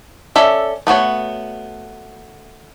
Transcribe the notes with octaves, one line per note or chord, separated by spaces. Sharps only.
C#4 A4 D5 E5
A3 B3 F#4 C#5